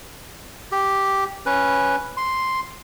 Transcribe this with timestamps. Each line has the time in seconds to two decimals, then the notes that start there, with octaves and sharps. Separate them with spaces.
0.72 G4
1.46 C#4 B4
2.17 C6